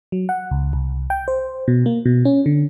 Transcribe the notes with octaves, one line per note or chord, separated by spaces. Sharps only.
F#3
F#5
C#2
C2
G5
C5
B2
A#3
B2
C#4
D3